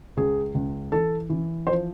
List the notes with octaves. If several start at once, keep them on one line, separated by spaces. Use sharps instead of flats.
C#2 G#4
C#2
E3 A4
E3
F3 C5